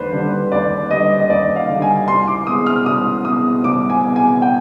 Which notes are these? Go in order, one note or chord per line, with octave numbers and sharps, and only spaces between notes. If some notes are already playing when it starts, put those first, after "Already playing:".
Already playing: D#2 D3 G3 B4 C5 D5
D3 G3
D#2 D5
D3 G3 D#5
D#5
D#2 D5
F5
D3 G3
G#5
C2 C6
D6
B2 G#3 D#6
F6
C2 D#6
B2 G#3 D#6
C2 D6
G#5
B2 G#3
G#5
G5